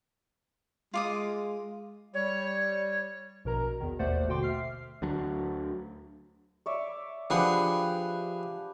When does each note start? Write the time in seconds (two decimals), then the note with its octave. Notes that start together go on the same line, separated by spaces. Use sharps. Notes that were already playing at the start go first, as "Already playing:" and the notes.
0.94 G#3 F4 D6 D#6
2.14 G3 C#5
3.45 A#1 B2 A#4 A#5
3.80 E2 B2 D#3
3.99 G#1 D#2 A3 C5 D5 F#5
4.28 B2 D3 F#4 G5 C6 D6
4.43 E5 F6 C7
5.02 D2 D3 F#3 D4
6.66 C#5 D5 E5
7.30 F3 D4 G4 G#4 B4 F#5